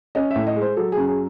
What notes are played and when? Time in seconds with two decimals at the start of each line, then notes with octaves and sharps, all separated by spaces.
0.15 C#4 D#5
0.31 E5
0.36 A2
0.47 D#5
0.56 G#3
0.62 C5
0.77 F#3 A4
0.92 G#4
0.97 F#2
1.07 G#4